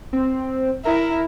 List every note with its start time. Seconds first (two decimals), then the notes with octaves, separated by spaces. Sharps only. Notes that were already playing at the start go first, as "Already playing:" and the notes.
0.13 C4
0.85 E4 A#4